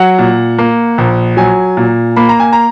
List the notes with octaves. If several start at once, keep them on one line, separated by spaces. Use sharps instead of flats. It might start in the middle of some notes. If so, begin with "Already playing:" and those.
Already playing: F#3 F#5
A#2
A#3
A#1
F#3 G#5
A#2
A#3 B5
A#5
G#5
A#5